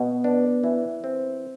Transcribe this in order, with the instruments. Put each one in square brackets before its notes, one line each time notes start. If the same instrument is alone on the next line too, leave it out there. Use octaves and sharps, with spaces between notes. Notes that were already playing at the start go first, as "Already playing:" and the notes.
Already playing: [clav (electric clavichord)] B2 [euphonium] B3
[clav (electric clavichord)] D4
E3
C4